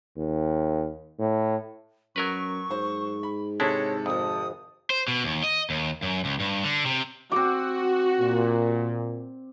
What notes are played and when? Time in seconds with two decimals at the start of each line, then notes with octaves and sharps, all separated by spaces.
0.17 D#2
1.19 A2
2.16 F#2 F#3 A#4 B4 C#6
2.71 G#2 C5
3.23 B5
3.60 C3 G#3 D4 E4 A4 C#5
4.06 G#1 F2 D#6
4.90 C5
5.08 B2
5.24 D#2
5.44 D#5
5.70 D#2
6.02 F#2
6.25 C#2
6.40 G2
6.64 D3
6.85 C3
7.32 C4 F#4 D6
8.20 A#2